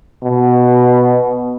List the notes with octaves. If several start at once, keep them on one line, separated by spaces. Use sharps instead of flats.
B2